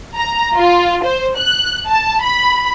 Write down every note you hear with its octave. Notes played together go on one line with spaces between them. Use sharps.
A#5
F4
C5
F#6
A5
B5